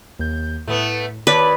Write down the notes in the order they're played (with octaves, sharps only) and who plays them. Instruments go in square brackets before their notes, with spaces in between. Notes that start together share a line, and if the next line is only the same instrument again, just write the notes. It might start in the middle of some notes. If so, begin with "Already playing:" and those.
[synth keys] D#2 G6
[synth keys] A2 [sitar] A3 B3
[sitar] D#2 D5 [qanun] B4 [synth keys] C#5 A5 D6